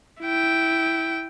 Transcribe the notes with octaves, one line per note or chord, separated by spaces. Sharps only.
E4 G5